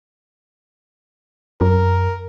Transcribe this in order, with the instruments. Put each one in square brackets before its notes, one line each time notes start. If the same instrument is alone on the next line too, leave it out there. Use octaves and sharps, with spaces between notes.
[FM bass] F#2 [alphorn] A#4